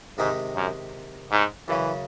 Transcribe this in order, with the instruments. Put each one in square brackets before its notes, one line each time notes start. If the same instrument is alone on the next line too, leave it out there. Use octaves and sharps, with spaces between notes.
[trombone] G#2 [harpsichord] C3 D#3 G#3 D#4
[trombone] F#2
G#2
[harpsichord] F#2 C#3 F#3 [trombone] E3